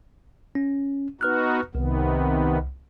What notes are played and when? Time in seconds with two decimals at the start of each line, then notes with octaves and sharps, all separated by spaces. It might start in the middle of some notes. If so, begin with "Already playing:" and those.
0.55 C#4
1.21 B3 D#4 F#4 B4 F6 F#6
1.75 C2 C3 D#3 B3